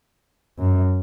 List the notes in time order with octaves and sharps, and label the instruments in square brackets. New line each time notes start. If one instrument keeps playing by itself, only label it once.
[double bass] F#2